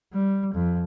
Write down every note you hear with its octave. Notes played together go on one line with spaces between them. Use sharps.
G3
F2